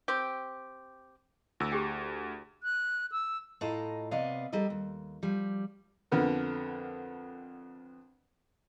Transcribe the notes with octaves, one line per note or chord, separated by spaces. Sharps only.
C4 G4
D2 E4 E6
G4 G#4 G5
F#6
E6
A2 F4 A4 D#5 A5 A#5
C3 B3 D5 D#5 F5
G3 A4 A#4 D#5
D#2
F3 G3
F2 D3 B3 A#4